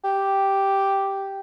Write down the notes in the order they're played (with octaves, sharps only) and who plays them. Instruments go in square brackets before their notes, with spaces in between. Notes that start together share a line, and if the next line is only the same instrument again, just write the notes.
[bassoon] G4